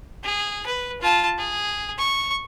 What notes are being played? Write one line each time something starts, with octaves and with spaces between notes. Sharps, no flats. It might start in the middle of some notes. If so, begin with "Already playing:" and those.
G#4
B4
F4 A5
G#4
C#6